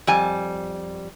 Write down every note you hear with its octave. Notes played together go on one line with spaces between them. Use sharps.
F2 G3 G#5